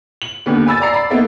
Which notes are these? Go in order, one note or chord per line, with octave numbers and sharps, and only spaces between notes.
F#7
D#2 D3 B3
G#5 B5 E6 A6
D5 A#5 C7
D5 B5
A#3 B3 D#4 A4 E5